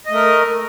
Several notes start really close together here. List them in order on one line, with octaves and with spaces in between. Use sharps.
D#5 A3 A#4